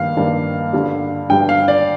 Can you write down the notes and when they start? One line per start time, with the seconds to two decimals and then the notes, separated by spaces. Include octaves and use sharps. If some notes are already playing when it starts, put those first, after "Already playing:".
Already playing: G2 D#3 A#3 F5
0.17 G2 D#3 A#3
0.73 G2 D3 G3
1.30 G2 D3 G3 G5
1.49 F5
1.68 D5